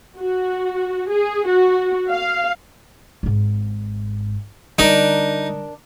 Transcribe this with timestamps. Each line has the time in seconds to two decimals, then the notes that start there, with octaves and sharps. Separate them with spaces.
0.20 F#4
1.11 G#4
1.49 F#4
2.12 F5
3.23 G#1 G#2
4.79 D3 G3 D4 D#4 A#4